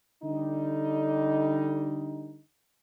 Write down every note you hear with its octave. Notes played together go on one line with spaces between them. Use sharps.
D3 G3 D#4